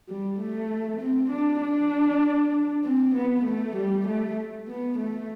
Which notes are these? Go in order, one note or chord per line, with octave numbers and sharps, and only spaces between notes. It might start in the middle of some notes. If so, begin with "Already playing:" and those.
G3
A3
C4
D4
D4
C4
B3
A3
G3
A3
B3
A3